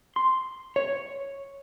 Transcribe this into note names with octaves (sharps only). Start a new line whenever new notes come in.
C6
C#5